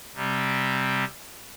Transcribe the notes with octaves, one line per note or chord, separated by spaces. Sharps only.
C3 G3 C4